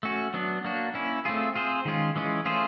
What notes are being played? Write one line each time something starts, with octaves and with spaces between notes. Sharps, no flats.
A3 C#4 F#4
F#3 B3 D4
A#3 D4 F#4
A#3 C#4 E4
A3 C4 F4 G#4
C4 F4 G#4 C5
D#3 G#3 C#4 F4
E3 G#3 C#4 F4
A3 C#4 F4 G#4 C5